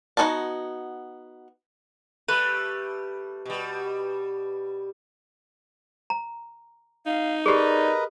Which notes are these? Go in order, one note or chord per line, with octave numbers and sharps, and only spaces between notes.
B3 D#4 F#4 G#5 A5
G3 A3 B4
B2 G3
A#5
D#4 F5
G4 G#4 A#4 B4 D5 D#5